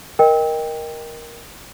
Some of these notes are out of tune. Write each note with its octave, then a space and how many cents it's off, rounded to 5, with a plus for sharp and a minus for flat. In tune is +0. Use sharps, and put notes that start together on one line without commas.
A#4 +10 D#5 +0 G5 +15